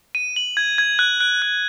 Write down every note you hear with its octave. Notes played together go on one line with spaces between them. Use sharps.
D#7
F#7
G#6
G#6
F#6
F#6
F#6